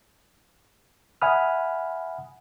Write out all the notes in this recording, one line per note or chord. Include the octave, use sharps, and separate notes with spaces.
E5 F#5 G#5 B5 D#6 F6